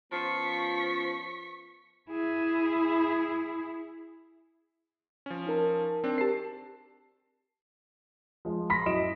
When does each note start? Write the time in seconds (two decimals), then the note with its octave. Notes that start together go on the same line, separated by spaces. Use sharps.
0.12 F3 B3 C#4 F4 C#6 B6
2.10 E4 G#4
5.26 F3 C#4
5.47 D#4 A#4 A5
6.04 C4 D4
6.18 G4 A#4 A5 C7
8.45 F3 G#3
8.70 B5 C6 A#6 B6
8.86 F#2 E4 D#5 D7 E7